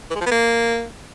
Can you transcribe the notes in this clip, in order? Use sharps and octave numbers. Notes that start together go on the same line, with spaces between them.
E3
G#3
F3
B3
A#3